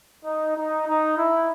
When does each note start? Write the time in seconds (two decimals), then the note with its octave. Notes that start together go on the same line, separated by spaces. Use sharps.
0.25 D#4
0.56 D#4
0.86 D#4
1.17 E4